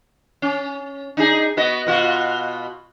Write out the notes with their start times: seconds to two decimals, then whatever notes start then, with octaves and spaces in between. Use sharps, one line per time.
0.42 C#4
1.17 D4 D#4 G#4
1.57 B3 F#4 D#5
1.87 B2 F4 F#4